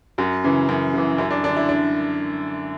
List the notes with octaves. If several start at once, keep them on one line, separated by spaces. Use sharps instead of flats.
F#2 F#4
C#3 E3
F#2
C#3 E3
F#2 E4
D4
D3 D4
E4
D4